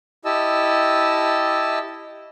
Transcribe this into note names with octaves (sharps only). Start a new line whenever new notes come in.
E4 G4 D#5 A5 E6